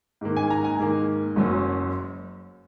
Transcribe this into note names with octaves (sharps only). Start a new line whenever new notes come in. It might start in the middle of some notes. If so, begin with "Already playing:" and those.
G#2 D#3 A#3
G#5
A#5
G#5
G#2 D#3 A#3
F#1 F#2 F#3 C#4